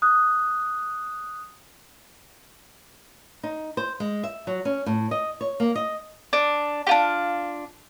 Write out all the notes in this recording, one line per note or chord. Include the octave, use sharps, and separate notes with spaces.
D#6 F#6
D#4
C5
G#3
E5
F#3
C#4
A2
D#5
C#5
A#3
D#5
D4
D4 F4 G4